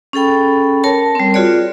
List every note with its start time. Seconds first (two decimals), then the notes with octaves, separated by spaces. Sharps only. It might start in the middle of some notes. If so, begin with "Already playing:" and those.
0.13 C#4 G#4 A4 G5 B5
0.84 A#4 C#5 A5
1.15 G3 C4
1.34 F4 F#4 G#4 C#5 D5